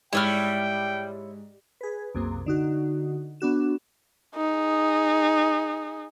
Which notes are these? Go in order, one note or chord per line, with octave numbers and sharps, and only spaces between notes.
G#2 G3 E4 C#5 G5 F6
G#4 B4
C2 F#2 C3 A#3
D3 D#4 F#4
B3 D4 F#4 E7
D#4 G#4